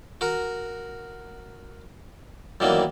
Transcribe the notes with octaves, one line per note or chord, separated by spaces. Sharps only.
F#4 A#4
F#2 D#3 E3 G3 A#3 B3